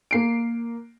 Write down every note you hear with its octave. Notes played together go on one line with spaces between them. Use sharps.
A#3 C7 D7